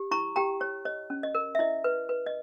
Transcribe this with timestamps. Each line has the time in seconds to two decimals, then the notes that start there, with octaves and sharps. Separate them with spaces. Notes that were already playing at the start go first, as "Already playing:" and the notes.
Already playing: G4
0.11 E4 A#5 C#6
0.36 G4 G5 A#5
0.60 G4 C#5
0.85 C#5 D#5
1.10 C#4
1.23 D#5
1.35 A#4
1.55 E5
1.59 E4 D#5
1.84 B4
2.09 B4
2.26 D#5